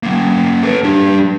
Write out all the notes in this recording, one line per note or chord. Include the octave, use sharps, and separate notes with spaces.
A#3 C#4
A4 B4
G3 D4